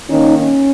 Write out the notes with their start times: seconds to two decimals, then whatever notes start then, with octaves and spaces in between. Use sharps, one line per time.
0.09 D#3 A#3 C#4 D#4
0.38 C#4